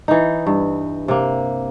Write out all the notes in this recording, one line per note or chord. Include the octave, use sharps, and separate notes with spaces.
E3 D#4
G2
C3 A#3